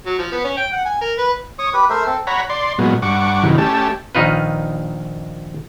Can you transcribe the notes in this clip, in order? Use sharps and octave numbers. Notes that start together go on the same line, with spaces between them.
F#3
F3
B3
C#4
G5
F#5
G#5
A#4
B4
C#5 C#6 D#6
G4 B4
A3 A#4 C5 E5
C4 A4
C#5 F#5 A#5 B5
D5 C6
A#2 F#3 G#3 B3
G2 F#5 C#6 D6
F#2 C3 D#3 E3
A3 C#4 G4 A5
A#1 D#3 D#4 F4 B4